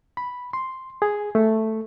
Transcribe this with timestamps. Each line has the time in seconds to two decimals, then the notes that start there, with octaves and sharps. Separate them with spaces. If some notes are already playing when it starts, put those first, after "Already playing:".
0.17 B5
0.53 C6
1.02 G#4
1.35 A3